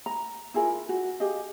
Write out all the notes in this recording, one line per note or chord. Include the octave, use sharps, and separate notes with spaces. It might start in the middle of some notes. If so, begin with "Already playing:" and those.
A#5
E4 F4 G#4 A#4
F#4
G4 G#4 D#5 F5